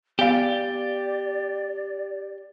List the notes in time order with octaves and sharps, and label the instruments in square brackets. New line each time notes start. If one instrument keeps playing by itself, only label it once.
[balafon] B3 F5 [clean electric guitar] G4 [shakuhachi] D5